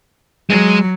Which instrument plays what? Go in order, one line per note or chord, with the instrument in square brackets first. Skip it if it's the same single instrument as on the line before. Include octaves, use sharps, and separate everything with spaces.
[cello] F#3 [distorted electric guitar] G#3